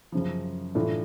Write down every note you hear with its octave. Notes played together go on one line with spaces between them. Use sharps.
F#2 C#3 F3
A2 E3 A3 D4 F4